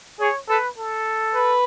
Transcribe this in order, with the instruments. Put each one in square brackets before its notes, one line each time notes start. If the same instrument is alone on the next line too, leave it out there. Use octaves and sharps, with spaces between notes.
[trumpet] G#4 [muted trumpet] C#5
[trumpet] A4 [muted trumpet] B4
[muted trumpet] A4
[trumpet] B4